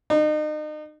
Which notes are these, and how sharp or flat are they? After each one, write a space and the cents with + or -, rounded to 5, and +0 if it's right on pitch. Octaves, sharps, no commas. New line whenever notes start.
D#4 -35